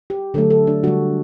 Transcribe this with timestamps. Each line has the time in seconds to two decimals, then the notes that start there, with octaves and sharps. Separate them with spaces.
0.10 G4
0.34 D3 F#3 A3 A4
0.50 A4
0.67 D4
0.83 D3 G3 F#4